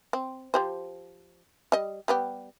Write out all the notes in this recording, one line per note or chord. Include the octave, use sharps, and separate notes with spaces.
C4
F3 G4 C5
G3 D#5
G3 B3 G4